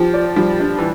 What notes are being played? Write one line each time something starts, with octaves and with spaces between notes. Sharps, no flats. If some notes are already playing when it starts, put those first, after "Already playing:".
Already playing: F3 G4
D5
F3 G3
D4
E3